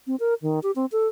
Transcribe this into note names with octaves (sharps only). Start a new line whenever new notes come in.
C4
A#4
D#3
G4
C4
A4